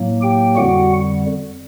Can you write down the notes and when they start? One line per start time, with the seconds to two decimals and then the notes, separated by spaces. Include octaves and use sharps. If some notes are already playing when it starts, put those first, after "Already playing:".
Already playing: A2 F#3 A#3
0.22 G4 G5
0.56 F2 D3 G3 F#4 F#5